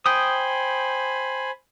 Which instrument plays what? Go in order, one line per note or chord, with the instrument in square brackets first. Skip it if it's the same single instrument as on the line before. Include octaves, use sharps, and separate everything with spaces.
[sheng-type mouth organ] C5 G#5 B5 [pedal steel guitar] G5 D#6